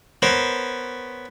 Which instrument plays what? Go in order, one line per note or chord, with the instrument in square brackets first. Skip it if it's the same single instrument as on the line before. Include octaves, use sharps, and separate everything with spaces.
[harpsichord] B3 C#4 A#4 C5